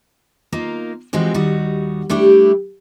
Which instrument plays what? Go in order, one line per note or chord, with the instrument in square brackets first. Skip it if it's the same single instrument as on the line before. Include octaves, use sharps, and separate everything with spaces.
[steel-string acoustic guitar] A#3 D#4 F4 A#4
E3 F3 G#3 C4 F#4 G4
D#2 G3 D#4 F#4
G3 A3 D4 E4 G4